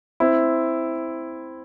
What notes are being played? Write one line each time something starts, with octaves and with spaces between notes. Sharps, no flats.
C4 E4